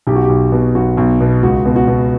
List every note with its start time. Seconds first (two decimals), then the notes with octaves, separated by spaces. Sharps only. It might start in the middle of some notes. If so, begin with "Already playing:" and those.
0.07 B1 G4
0.15 F#4
0.24 G4
0.29 B1
0.52 B2
0.75 B1 F#4
0.97 B1
1.20 B2
1.43 C#2 F#4
1.66 B2
1.76 F#4
1.88 B2